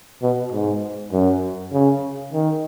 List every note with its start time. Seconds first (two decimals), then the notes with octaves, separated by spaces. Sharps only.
0.22 B2
0.52 G#2
1.12 F#2
1.72 C#3
2.33 D#3